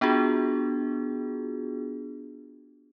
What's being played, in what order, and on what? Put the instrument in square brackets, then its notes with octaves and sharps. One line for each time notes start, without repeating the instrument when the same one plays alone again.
[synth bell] B3 D4 F4 F#4 G#4